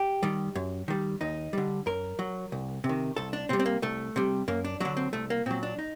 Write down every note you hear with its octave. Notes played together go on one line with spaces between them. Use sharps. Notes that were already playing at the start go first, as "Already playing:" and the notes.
Already playing: G4
D#3 G3
F#2
D#3 G3
D#2 D#4
D3 G3
F#2 A#4
F#3
C2
C3
D#3
C2 A4
D4
C3 G3 C4
C4
A#3
C2 A3
C3 G3
F#2 A#3
D4
D3 F#3 D4
C4
C2 A3
A#3
A#2 F#3 C4
D4
D#4